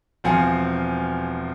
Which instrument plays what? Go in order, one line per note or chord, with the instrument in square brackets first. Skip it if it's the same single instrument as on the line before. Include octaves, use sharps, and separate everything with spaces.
[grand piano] E1 F3 C4 F5 G#5 C#7